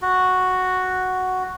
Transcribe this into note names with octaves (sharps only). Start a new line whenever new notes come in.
F#4